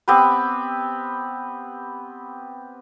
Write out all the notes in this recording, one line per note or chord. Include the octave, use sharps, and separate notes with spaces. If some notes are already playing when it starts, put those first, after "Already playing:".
B3 C4 G4 B4